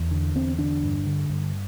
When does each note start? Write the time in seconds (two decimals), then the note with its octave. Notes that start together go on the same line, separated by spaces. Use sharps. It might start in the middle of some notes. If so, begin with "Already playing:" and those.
Already playing: E2
0.11 D3
0.35 E2 C4
0.58 D3 D4
0.83 G2
1.07 D3
1.30 G2